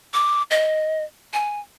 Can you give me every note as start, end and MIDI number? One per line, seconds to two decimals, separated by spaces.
0.14 0.43 86
0.51 1.04 75
1.33 1.60 80